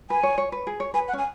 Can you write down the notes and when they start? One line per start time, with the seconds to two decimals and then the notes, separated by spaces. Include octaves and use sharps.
0.10 B4 G#5
0.23 C#5
0.38 C#5
0.52 B4
0.67 G#4
0.80 C#5
0.94 B4 G#5
1.08 F#5
1.13 C#4
1.18 G#5